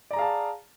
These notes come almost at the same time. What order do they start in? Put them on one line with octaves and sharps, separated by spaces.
D5 A#5 G#4 F5 A5